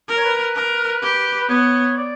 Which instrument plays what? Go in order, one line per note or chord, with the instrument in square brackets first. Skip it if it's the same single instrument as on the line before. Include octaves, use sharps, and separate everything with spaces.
[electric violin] A#4
[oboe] C#5
B4
[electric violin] A#4
G4
[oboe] B4
[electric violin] B3 [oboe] C#5
[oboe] D5